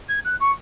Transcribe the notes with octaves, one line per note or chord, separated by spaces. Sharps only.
G#6
F#6
C#6